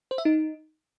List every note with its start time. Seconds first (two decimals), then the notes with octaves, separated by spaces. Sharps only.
0.11 C5
0.18 E5
0.25 D#4